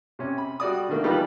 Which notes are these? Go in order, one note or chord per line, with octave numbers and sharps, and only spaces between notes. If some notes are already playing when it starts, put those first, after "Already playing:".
C3 C#4
B5
G3 F#4 D5 D#6
D3 D#3 A3 A#3 D4
E3 F3 G3 D#4 F4 B4